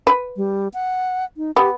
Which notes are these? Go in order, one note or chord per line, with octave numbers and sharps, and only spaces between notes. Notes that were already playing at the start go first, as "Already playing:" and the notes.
B4
G3
F#5
D#4
B3 G4